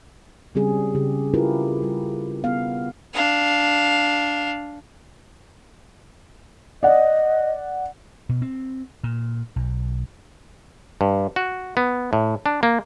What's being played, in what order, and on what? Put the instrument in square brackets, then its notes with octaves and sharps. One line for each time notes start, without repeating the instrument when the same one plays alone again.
[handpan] C#3 G3 C4 C#4 G#4
C#3 G4
E4 F4 G4 G#4 A#4 B4
G3 F4
B3 F5
[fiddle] D4 F5
[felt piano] D5 F#5 [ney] D#5
[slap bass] B2
C4
A#2
B1
[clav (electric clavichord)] G2
F#4
B3
A2
D4
A#3